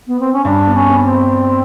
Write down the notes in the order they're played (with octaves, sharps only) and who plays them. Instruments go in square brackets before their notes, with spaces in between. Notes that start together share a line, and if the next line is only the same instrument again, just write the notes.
[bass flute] B3
C4
C#4
[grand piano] G2 [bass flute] D4
[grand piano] B3
[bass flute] C#4
[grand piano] B3
[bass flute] C#4
C4